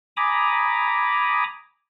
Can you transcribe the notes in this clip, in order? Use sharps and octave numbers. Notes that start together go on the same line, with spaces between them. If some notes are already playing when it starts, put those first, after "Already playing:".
G#5 A#5 B5 D6 D#6